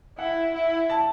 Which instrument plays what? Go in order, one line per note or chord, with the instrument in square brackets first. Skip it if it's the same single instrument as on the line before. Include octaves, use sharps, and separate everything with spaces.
[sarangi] E4 [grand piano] F#5
[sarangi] E4
[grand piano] A5